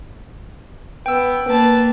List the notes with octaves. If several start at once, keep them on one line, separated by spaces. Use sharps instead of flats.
B3 G5 E6
A#3 B4 A5